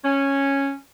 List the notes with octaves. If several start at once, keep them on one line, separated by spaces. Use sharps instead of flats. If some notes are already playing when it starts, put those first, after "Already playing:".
C#4